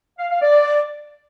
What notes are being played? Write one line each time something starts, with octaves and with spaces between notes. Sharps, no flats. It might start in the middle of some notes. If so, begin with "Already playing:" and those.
F5
F5
D5